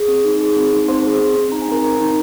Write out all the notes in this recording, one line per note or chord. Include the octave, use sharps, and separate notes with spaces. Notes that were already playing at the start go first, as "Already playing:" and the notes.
Already playing: G#4
C4
D#4
G#4
C4
D#4
C4 C5 C6
G#4
C4
C4
D#4 A#5
G#5
C4 A#4 A#5
C4
D#4